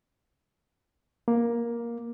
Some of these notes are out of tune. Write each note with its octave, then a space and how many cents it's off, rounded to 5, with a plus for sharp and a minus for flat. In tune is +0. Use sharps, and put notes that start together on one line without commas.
A#3 +10